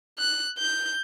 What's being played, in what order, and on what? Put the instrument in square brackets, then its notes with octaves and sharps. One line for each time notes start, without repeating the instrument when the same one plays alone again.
[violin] F#6
G6